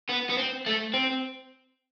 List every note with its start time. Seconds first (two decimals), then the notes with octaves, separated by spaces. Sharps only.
0.10 B3
0.30 B3
0.37 C4
0.66 A3
0.94 C4